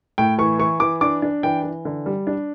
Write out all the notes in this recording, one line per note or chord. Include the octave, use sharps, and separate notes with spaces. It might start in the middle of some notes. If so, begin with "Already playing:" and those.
A2 G5
E3 C#6
E3 C#6
E3 D6
D4 D6
D4
E3 G5
E3
D3
G3
D4